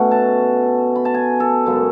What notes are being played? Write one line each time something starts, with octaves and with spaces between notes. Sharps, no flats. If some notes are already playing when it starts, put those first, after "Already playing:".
Already playing: B2 A3 C#4 F#5
A5
B5
A5
G#5
A4
F#2 C#3 G#3